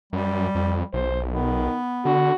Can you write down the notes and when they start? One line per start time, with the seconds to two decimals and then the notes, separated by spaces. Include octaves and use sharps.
0.13 F#2 G3
0.55 F2
0.93 B1 C5
1.34 D#3 B3
2.05 D3 F#4